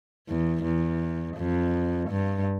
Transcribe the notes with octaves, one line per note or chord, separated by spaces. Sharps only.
E2
E2
F2
G2